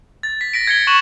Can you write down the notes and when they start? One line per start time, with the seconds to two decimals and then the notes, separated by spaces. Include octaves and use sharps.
0.23 A6
0.41 B6
0.54 A#6 B6 D7
0.67 G#6 C#7 G7
0.87 C#6 F#6 E7 F#7